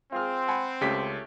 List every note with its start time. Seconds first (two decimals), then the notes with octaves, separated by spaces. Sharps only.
0.12 C4 F4 G#4 F6
0.48 F#5 G#5 B5
0.81 C#2 A3 C#4 G4 B6